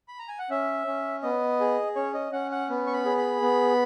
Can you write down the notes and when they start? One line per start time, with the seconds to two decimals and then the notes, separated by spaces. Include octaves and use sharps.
0.08 B5
0.19 A#5
0.28 G#5
0.39 F#5
0.50 C#4 E5
0.87 C#4
1.23 B3 D#5
1.60 G#4
1.96 C#4 C#5
2.14 D#5
2.32 C#4 F#5
2.51 F#5
2.70 B3
2.87 C#6
2.93 B5
3.05 G#4
3.18 B5
3.42 B3